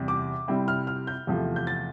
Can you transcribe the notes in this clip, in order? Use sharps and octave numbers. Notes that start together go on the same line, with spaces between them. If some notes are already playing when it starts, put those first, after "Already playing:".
Already playing: E2 C3 G3 C4
D6
C3 G3 C4 E4
F6
F6
G6
E2 C3 F3 A3
G6
A6